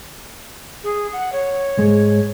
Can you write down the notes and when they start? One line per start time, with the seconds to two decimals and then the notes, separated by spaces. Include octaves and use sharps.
0.84 G#4
1.13 F#5
1.32 C#5
1.79 G#2 G#3